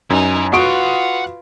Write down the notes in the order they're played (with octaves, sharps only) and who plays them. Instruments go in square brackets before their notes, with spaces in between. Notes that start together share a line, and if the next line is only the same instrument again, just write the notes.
[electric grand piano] F#2 [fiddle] D#4 [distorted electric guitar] E4 G#5
[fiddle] F4 B4 [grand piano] F#4 C#6 D7 [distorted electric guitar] F#5 C6 [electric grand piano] D#6